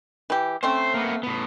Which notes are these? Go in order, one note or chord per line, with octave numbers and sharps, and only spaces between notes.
E3 G4
A3 C4 C#4 C5
A#3 B3
A2 B3